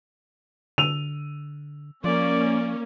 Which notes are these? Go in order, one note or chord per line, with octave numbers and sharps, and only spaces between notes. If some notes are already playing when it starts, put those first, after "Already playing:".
D3 E6 D#7 F7
F3 A#3 C#4 D5